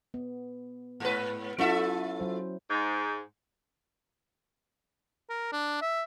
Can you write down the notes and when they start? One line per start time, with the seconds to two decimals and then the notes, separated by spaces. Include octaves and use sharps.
0.14 B3
1.00 G#2 B4
1.58 F#3 C#4 E4 F4 A4 E5
2.20 F#3 C5
2.70 G#2
5.30 A#4
5.52 D4
5.82 E5